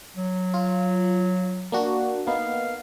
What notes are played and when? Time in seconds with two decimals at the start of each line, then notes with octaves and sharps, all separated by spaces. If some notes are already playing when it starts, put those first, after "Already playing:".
0.16 F#3
0.54 F4
1.72 A#3 D4 F#4
2.27 A#3 B3 D#4 F5